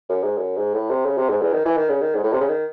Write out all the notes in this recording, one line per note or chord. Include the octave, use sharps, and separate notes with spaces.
F#2
G#2
F#2
G#2
A2
C3
C#3
C3
G#2
E2
D#3
E3
D#3
C#3
D#3
G#2
A2
C3
C#3
D#3